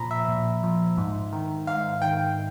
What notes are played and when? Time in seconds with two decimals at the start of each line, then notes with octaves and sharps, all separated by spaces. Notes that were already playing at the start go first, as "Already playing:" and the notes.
Already playing: A#2 F3 A#5 B5
0.11 E5
0.28 A#2
0.63 F3
0.97 G#2
1.33 D#3
1.67 G#2 F5
2.02 D#3 G5